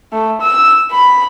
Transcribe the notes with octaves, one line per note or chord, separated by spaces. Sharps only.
A3
E6
B5